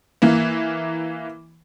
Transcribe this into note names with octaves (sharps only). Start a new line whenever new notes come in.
E3 A#3